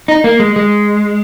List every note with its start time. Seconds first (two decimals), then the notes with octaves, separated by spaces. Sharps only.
0.08 D#4
0.24 A#3
0.40 G#3
0.56 G#3